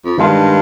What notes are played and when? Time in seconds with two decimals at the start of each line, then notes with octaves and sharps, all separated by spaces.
0.05 F2
0.18 G2 D#3 G#3 D4 F4